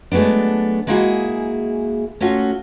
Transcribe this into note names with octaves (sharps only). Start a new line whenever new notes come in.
F#3 G#3 A3 B3 D4
G#3 A#3 D#4 E4 F#4 G#4
A3 C#4 F4 F#4